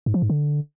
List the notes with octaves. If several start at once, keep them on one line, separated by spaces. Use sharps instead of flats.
G#2
F3
G#2
D3